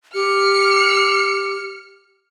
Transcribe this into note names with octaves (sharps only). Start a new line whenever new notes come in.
G4 F6 C#7